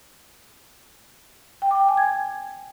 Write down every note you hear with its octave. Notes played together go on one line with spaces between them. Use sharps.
G5
D6
G5
G#5
G#6